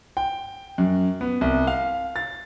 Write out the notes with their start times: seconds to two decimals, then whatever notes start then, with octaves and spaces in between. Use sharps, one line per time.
0.17 G5
0.78 F#2
1.21 B3
1.41 C2
1.67 F5
2.16 A6